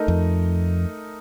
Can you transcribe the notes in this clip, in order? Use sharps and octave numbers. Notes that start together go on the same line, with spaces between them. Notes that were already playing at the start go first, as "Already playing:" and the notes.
Already playing: A3 D#4 A#4 D#5
F2